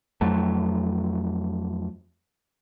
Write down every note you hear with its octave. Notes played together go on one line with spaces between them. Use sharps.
F2 F#3 A3